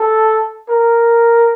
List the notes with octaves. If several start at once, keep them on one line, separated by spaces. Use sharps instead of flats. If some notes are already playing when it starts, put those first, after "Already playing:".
Already playing: A4
A#4